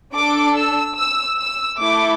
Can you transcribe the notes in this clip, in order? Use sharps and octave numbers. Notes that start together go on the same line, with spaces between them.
D4 A4 D6
E6
E6
E6
A3 E4 A4 D6